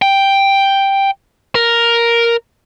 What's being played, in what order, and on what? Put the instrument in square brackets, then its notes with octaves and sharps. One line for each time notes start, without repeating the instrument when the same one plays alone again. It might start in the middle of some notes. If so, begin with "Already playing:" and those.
[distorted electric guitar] G5
A#4